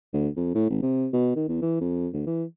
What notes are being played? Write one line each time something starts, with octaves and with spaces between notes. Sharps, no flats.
D2
F2
A2
G#1
C3
B2
D#3
E2
E3
F2
D2
E3